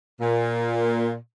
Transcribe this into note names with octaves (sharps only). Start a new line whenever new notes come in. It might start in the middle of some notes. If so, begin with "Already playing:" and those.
A#2